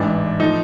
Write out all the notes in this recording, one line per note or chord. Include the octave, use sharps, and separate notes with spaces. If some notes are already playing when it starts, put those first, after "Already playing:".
Already playing: A1 G#2 E3 D4
A2 F3 D#4